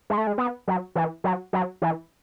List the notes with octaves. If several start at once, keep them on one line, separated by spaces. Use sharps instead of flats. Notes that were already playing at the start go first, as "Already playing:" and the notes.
G#3
A3
G#3
B3
F#3
E3
F#3
F#3
E3